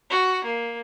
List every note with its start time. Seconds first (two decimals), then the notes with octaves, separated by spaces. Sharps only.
0.10 F#4
0.44 A#3